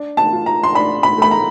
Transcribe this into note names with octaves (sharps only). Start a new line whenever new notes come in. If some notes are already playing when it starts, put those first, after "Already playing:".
Already playing: D4
A5
F4
A#5
C6
D4 B5
B5
A3 B5
A#5